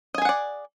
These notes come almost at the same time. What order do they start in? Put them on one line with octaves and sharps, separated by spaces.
D#5 G#5 G#4 F#5 D5